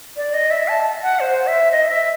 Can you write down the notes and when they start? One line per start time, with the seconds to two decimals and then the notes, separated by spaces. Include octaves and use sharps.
0.17 D5
0.34 D#5
0.51 E5
0.68 A5
1.03 F#5
1.20 C5
1.47 E5
1.72 D#5
1.89 E5